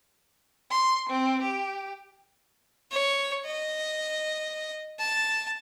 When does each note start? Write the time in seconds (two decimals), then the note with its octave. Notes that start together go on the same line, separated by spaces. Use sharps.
0.70 C6
1.09 C4
1.42 G4
2.91 C#5
3.46 D#5
4.99 A5